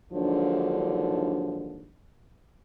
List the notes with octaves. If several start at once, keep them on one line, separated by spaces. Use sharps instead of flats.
D#2 G#2 D3 F3 F#3 D4